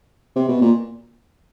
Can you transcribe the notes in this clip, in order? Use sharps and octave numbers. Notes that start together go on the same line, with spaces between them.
C3
B2
A#2